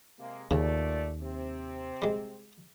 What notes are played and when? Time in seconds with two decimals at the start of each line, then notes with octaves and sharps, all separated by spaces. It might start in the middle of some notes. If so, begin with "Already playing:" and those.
0.18 C3 G#3 A#3
0.51 D#2 A#2 C#3 A3 D5
1.21 C3 C4
2.02 G3 G#3